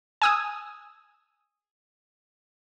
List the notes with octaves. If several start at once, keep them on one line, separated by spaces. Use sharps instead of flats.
G#5 D#6 E6